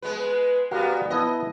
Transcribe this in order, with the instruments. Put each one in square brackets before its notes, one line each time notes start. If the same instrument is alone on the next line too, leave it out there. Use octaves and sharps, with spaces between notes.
[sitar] G#3 B3 B4
[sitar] G3 B3 [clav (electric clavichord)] F#4 A#4 F5
[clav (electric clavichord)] B3 E4 A5 [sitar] D#5